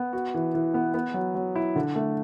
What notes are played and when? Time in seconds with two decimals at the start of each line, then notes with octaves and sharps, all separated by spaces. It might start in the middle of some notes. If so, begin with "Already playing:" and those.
Already playing: B3
0.13 F#4
0.34 E3
0.55 E3
0.74 B3
0.94 B3
1.14 F#3
1.35 F#3
1.55 E4
1.76 D3
1.95 A3